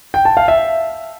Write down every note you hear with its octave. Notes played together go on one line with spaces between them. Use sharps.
G5
A5
F5
E5